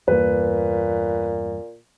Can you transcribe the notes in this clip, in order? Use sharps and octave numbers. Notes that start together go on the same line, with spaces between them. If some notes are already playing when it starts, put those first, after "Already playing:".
E2 G2 A#2 A#3 B4